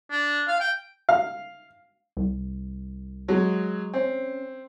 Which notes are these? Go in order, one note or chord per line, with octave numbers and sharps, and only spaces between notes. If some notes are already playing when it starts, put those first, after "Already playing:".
D4
F5
G5
F5
C2
F#3 G#3
C4 C#4